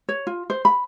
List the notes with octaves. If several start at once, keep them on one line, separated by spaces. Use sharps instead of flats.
C#5
F4
C5
B5